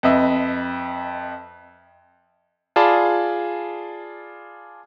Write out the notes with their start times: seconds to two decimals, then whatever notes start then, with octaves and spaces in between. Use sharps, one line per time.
0.03 F2 B4 D#5 E5
2.76 F4 G#4 D5 A5 B5